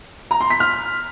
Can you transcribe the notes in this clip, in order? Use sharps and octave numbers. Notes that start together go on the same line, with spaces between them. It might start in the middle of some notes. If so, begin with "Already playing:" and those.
A#5
C6
B6
F6